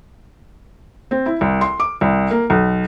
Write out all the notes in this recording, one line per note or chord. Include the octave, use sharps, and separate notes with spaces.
C4
E4
C2
C6
D6
C2
A#3
B1